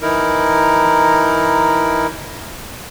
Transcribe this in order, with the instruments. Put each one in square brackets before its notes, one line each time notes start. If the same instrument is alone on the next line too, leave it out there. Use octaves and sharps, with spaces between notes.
[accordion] E3 D#4 E4 A#4